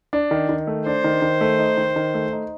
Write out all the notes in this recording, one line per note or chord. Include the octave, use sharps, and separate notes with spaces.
D4
D#3
D#3
A3
D4 C5
D#3
D#3
A3
D#4
D#3
D#3
A3
D#4